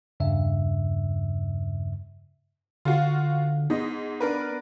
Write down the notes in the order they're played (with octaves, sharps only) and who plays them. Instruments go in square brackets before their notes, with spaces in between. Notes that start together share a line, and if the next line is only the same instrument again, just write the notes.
[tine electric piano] E2 G2 C#3 E5
[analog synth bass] D3 [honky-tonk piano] F4 F#4 F5
[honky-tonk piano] G#2 D#5 [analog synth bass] B3
[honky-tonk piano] D4 A#4 B4